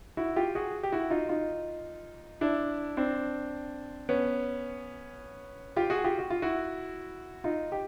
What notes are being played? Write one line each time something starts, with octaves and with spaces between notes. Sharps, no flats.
E4 F#4
F4 G4
F#4 G#4
G4
E4 F#4
D#4 F4
D#4 F4
D4 E4
C4 D4
B3 C#4
F4 G4
F#4 G#4
F4 G4
F#4
F4
E4 F#4
D#4 F4
G4